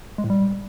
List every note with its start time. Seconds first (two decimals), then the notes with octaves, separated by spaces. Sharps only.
0.18 G#3
0.24 A2
0.30 G3